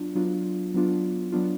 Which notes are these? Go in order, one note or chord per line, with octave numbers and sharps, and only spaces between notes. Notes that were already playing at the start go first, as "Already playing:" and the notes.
Already playing: F#3 B3 D4 F4
F#3 B3 D4 F4
F#3 B3 D4 F4
F#3 B3 D4 F4